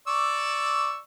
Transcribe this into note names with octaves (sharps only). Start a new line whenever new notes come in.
D5 C#6 E6